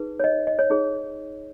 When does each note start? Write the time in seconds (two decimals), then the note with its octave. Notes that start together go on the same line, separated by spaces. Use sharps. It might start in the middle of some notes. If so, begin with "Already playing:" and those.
Already playing: D#4 G#4 B4
0.20 C#5
0.24 D#5
0.47 D#5
0.59 C#5
0.70 D#4 G#4 C#5